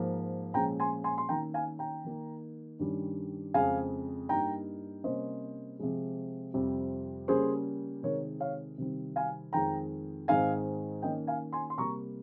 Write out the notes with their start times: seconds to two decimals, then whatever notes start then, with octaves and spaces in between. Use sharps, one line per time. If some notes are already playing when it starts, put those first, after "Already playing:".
Already playing: G#2 F3 A#3
0.54 A#2 F3 G#3 C#4 G5 A#5
0.80 G#5 C6
1.04 G#5 C6
1.18 C6
1.29 D#3 A#3 C#4 G5 A#5
1.54 F5 G#5
1.79 G5 A#5
2.05 D#3 A#3 D#4
2.79 G2 D#3 G3 C#4
3.54 F2 C#3 G#3 C4 F5 G#5
4.29 G2 G3 A#3 D#4 G5 A#5
5.04 C3 G3 A#3 C#4 C5 D#5
5.79 C3 F3 G#3
6.54 F2 C3 G3 C4
7.28 C#3 G3 A#3 C#4 G#4 C5
8.03 C3 D#3 G#3 A#4 C#5
8.40 C#5 F5
8.78 C3 D#3 G3 C4
9.16 F5 G#5
9.53 F2 D#3 G#3 G5 A#5
10.28 G#2 D#3 G#3 C4 D#4 F5 G#5
11.02 D#3 A#3 C#4 D#5 G5
11.27 F5 G#5
11.53 G#5 C6
11.70 C6
11.77 C3 G3 A#3 A#5 C#6